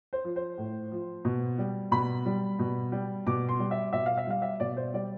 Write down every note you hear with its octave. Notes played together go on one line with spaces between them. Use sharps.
C5
F3
C5
A2
F3
B2
G3
B2 B5
G3
B2
G3
B2 D6
C6
G3
E5
B2 E5
F5
E5
G3 F5
E5
B2 D5
C5
G3 D5